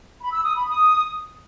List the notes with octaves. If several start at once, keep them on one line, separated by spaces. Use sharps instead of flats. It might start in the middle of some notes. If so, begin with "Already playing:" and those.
B5
E6
D#6
B5
D#6